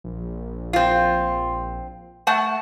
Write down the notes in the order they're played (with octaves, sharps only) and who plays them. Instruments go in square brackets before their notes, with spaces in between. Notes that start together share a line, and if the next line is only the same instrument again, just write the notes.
[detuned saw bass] A#1
[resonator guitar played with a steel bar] C4 F4
A3 F#5 A5